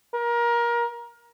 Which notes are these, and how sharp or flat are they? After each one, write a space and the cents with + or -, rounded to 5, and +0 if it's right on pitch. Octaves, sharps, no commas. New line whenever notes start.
A#4 +25